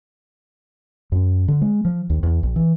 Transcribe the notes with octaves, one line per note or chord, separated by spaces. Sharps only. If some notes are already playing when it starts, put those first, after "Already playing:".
F#2
D3
G#3
F3
D#2
E2
A#1
E3